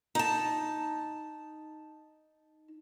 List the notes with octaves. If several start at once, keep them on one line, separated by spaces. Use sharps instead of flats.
D#4 A5